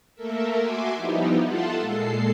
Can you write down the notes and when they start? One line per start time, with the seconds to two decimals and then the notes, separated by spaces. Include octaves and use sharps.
0.15 A3 A#3 A4 A#4 E5
0.57 F#4 E5 G#5 C6 D6
0.96 F3 G3 B3 D#4 E4 G4
1.42 F4 A4 E5 F#5 A5 C6
1.79 A#2 G#3 A4 C7